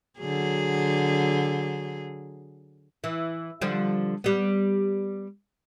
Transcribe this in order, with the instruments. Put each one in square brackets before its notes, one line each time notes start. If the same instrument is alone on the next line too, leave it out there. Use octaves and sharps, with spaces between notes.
[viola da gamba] D3 F#3 G#4
[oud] E3
D3 F3 G3
G3 B3